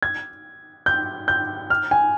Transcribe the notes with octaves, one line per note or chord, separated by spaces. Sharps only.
G#6
G6
G6
F6
G#5